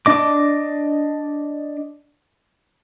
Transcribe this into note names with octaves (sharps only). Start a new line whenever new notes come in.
D4 D#5 D6